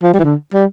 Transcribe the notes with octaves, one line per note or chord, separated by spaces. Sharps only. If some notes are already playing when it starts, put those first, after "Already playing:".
F3
G3
E3
D3
G3